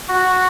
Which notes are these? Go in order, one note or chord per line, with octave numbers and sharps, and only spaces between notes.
F#4